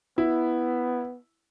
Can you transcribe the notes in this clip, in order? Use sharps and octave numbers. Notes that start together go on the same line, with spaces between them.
B3 E4